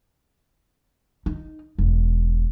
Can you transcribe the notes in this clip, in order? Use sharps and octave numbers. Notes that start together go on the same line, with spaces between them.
D#4
E1